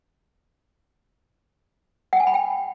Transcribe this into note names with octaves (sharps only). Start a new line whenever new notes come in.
F#5
G#5
B5
G5